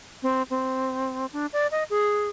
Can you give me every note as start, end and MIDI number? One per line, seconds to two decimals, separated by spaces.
0.23 0.42 60
0.50 1.26 60
1.33 1.46 62
1.53 1.67 74
1.72 1.84 75
1.90 2.29 68